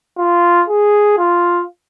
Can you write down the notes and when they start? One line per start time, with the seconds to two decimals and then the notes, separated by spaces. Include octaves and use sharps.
0.18 F4
0.68 G#4
1.18 F4